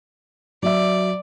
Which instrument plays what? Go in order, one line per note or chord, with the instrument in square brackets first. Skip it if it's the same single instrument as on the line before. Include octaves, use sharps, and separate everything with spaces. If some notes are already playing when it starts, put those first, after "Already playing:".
[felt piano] F#3 E5 [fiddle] D5